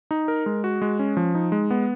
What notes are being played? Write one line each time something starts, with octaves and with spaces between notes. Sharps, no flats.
D#4
A#4
G#3
F#4
G#3
C#4
F3
D#4
G#3
B3